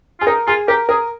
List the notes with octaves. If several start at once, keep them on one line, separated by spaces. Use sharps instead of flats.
F4 G#4
D#4 A#4
F4 G#4
G4 A#4
G#4 A#4